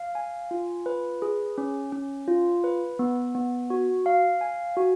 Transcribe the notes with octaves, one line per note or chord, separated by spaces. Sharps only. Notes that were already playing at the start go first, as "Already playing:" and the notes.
Already playing: F5
G#5
F4
B4
G#4
C#4
C#4
F4
B4
B3
B3
F#4
F5
G#5
F#4